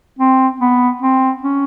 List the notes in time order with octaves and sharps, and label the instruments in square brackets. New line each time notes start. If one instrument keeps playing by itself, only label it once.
[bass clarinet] C4
B3
C4
C#4